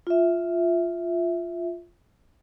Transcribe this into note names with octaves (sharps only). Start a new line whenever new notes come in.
F4 E5